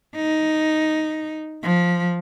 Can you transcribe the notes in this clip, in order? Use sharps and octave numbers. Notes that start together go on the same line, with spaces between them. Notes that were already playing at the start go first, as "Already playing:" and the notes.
D#4
F3